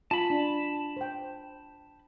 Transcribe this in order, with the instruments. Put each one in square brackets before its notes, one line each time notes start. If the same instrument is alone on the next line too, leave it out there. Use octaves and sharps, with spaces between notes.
[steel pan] F4 G#5 [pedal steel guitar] A5 B5
[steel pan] D4
C5 G5